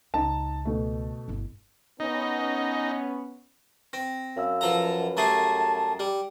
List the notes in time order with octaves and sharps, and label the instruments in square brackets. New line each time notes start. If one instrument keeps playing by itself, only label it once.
[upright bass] C#2 [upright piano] D#4 A5
[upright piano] B2 A3
[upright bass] G1 E4
[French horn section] B3 C#4 [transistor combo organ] D#4
[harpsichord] C4 [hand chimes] A#6
[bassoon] F#2 [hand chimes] E5 F5 E6
[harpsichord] F3 A4 A#5 [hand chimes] B4 F#5
[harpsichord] G3 A3 G#4 [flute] A5 [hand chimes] A#5 A6 C7
[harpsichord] G3